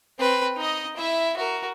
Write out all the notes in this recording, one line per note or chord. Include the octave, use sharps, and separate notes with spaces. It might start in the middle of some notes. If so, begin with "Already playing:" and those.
C4 B4
D#4 D#5
E4 E5
F#4 A#4